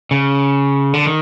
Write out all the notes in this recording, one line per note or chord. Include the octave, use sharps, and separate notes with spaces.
C#3
D3
D#3